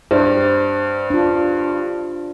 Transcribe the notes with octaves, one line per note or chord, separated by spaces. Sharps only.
G2 C5 D5
D4 F4